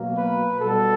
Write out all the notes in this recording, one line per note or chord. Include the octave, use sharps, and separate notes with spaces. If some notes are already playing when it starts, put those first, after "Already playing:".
Already playing: B2 F#3 A#3
B4
B2 G3 B3 A4